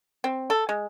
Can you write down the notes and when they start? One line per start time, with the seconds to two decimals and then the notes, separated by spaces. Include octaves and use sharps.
0.24 C4
0.50 A4
0.69 G#3